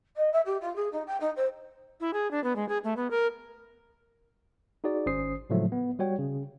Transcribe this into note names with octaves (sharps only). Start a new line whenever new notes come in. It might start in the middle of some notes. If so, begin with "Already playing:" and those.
D#5
E5
G4
F4
G#4
D#4
G5
D#4
C5
E4
G#4
D4
B3
G#3
G#4
A3
B3
A#4
D#4 F#4 G#4 D5
G#1 C#4 C5 D#6 C7
A2 C#3 F3 F#3 G#3 A3
B3
G3 F#4 C#5 G5
C#3